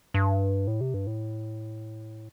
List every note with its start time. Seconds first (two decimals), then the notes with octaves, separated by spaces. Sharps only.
0.14 G2
0.67 A2
0.81 C3
0.94 G2
1.07 A2